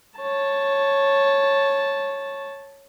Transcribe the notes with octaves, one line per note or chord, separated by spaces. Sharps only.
C#5 A5